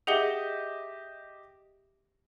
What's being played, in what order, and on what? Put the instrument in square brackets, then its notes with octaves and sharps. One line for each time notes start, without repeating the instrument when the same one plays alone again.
[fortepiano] G4 D#5 E5 [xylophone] G#4 F#5 G7